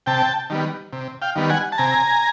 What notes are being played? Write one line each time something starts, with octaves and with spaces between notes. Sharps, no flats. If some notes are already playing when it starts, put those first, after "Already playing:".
C3 G5 A5
D#3 G3 B3
C3
F5 G5
D#3 G3 B3
F#5 G#5
A5
C3 G#5 A#5